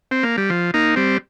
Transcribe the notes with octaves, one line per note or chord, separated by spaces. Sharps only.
C4
A#3
G3
F3
A#3 D#4
G3 C4